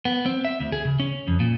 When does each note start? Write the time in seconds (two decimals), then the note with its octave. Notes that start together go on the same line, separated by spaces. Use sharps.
0.05 B3
0.26 C4
0.45 E5
0.60 D2
0.72 G#4
0.85 C#3
1.00 C#4
1.28 F2
1.40 A#2